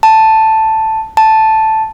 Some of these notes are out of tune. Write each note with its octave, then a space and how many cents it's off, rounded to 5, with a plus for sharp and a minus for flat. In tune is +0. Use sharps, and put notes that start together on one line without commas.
A5 +5
A5 +0